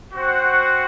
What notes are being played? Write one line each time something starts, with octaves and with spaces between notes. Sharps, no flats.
C4 F#4 C5 F#5